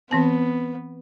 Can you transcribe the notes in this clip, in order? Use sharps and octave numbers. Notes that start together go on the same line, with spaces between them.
E3 B3 C4 A5